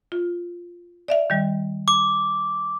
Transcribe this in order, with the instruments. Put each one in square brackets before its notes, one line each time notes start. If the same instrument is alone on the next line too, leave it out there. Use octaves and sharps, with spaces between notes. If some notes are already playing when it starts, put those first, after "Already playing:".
[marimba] F4
D5 E5 F5
D#3 G3
[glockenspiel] D6